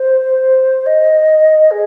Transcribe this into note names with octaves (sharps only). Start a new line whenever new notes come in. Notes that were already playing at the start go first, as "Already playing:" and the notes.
Already playing: C5
D#5
G#4